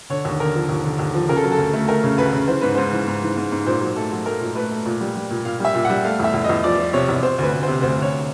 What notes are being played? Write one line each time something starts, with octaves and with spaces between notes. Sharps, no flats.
D3 C#5
D#2
D3 A#4
F3
D#2
D3
D#2
F3
C#3 A#4
A4
F#3
A4
D2
A3
A3 A#4
C#3
D2 B4
C#3
E3 C5
G#2 B4
G#2 C5
E3
G#2
E3
G#2
G#2
A#2 C5
F#3
A3 A4
F#3
A3 A#4
A#2
A3 B4
A3
A#2
G3
G3
A#2
A#2 F5
G3 E5
A#2
G3 F#5
A3 F5
E2 E5
E2
D#5
E2
F3 D5
F3
C3 C#5
E2
C3 C5
D2 B4
D2
C5
C3
D2 C5
D2
C#5